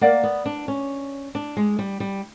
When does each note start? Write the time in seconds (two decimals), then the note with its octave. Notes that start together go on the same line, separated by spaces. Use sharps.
0.01 A#3 A#4 D5 F#5
0.23 B3
0.46 D4
0.68 C#4
1.35 D4
1.57 G#3
1.79 G3
2.00 G3